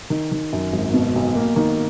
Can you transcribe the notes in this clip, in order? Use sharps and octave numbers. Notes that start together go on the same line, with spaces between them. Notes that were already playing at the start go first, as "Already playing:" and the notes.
D#3
D#3
F#2
G#1
B2
B1
A#3
D#3